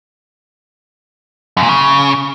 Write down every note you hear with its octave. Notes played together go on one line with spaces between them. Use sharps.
F#2
A#2
C#3